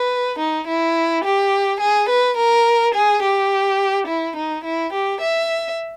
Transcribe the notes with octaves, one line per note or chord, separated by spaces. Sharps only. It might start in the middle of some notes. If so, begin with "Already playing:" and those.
Already playing: B4
D#4
E4
G4
G#4
B4
A#4
G#4
G4
E4
D#4
E4
G4
E5